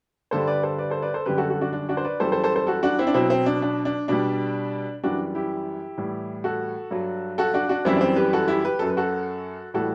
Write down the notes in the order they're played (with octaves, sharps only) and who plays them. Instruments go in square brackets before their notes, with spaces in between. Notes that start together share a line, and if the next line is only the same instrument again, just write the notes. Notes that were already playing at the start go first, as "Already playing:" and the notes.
[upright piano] G2 D3 G3 A4 C5
B4 D5
A4 C5
B4 D5
A4 C5
B4 D5
A4 C5
F#2 D3 G3 G4 B4
F#4 A4
F#4 A4
D4 F#4
D4
D4 F#4
C5
B4 D5
F#2 E3 G3 A4 C5
A4 C5
A4 C5
A4 C5
F#4 A4
D4 F#4
C4 E4
D4
B2 F#3 C4 E4
C4
D4
D4
D4
B2 G3 D4
F#2 E3 G3 D4 F#4
E4 G4
A2 E3 G3
F#4 A4
G2 F#3
F#4 A4
D4 F#4
D4 F#4
F#2 E3 G3 C4 E4
D4
C4
G4 B4
F#4 A4
E4 G4
G4 B4
F#2 F#3 A4
B4
F#4 A4
A2 E3 G3 F#4 A4